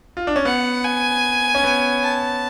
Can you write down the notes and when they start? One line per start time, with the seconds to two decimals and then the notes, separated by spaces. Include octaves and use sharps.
0.17 F4
0.27 D4
0.36 C#4
0.45 B3 F#5
0.85 G#5
1.55 C#4
1.64 B3
2.03 A5